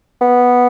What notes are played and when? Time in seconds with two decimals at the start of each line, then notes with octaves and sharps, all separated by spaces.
0.21 B3